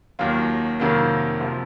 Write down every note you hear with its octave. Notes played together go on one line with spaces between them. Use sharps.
D#2 D#3 F#3 F4
F2 C3 D#3 F#3 A#3 F4
C3 F3